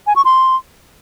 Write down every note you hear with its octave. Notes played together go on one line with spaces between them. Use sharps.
G#5
C#6
C6